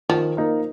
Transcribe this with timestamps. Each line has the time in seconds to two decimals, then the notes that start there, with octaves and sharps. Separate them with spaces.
0.09 D#3 F3
0.37 A#3 D#4